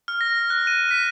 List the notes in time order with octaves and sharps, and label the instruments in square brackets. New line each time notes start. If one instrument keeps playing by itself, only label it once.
[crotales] F6
A#6
F#6
D#7
B6